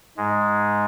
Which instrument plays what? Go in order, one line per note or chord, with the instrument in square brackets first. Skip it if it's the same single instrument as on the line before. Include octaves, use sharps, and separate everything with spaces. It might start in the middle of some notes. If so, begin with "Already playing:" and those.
[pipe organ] G#2 G#3